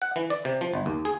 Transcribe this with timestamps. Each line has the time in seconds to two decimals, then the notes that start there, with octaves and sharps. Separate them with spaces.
0.02 F#5
0.16 E3
0.30 D5
0.45 C3
0.61 F3
0.74 G1
0.86 D#2
1.05 G#4